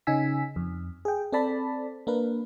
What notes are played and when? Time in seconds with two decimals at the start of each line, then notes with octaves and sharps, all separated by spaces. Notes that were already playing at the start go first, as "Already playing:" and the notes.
0.07 C#3 C#4 D#4 G#5 E6 B6
0.56 F2
1.05 G#4 G5
1.32 C4 A4 D5 A5 B5
2.07 A#3 D4 A#4 B4